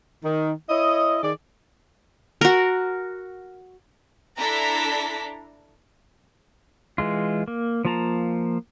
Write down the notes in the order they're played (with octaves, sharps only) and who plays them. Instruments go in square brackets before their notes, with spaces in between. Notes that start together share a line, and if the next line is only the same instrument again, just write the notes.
[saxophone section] D#3
E4 C#5 D#5
D#3 G#4 D5
[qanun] F#4 A#4
[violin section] D4 E4 A4 A#5 B6
[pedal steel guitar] E3 G#3 F4
A#3
F3 A#3 F4 A5 A#5